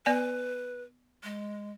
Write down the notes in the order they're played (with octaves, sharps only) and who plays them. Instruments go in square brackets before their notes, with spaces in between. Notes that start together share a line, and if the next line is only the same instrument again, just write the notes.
[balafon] B3 D5 G#5 [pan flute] B4
[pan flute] G#3